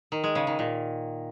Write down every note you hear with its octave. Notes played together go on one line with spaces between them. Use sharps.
D#3
G#3
C#3
D#3
A#2